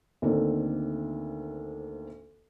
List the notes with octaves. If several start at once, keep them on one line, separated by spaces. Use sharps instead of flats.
D2 D#3 A3 A#3 C4